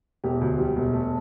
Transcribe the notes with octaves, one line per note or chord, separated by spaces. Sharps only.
E1 G4
D2
G3
E1
A3